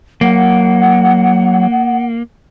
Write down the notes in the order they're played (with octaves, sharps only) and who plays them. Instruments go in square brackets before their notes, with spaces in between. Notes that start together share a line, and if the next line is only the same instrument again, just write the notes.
[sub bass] F#3 [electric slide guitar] A#3 [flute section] F#5